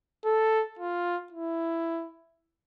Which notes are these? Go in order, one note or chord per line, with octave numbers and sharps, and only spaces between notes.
A4
F4
E4